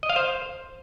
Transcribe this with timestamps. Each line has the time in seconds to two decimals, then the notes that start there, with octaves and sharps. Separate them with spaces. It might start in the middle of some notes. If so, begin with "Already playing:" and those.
0.03 D#5
0.10 F5
0.16 C5